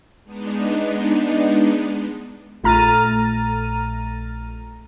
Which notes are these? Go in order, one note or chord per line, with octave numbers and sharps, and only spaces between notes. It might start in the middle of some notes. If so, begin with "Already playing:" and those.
G#3 B3 D4 D#4
A#1 A3 A#5 F6 A6 D#7